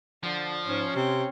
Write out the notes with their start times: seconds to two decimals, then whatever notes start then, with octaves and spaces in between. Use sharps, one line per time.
0.23 D3 F3
0.66 G#2 C#4
0.95 C3 C4